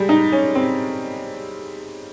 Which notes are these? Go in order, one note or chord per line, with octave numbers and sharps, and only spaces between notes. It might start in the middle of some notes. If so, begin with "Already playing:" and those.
Already playing: G3 G#3
D#4
C#4
C4